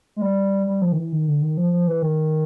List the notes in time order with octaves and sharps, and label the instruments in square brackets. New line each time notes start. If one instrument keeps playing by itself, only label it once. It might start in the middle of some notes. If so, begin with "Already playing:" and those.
[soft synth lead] G#3
G3
G3
F3
D#3
E3
D#3
D3
D#3
F3
F3
E3
D#3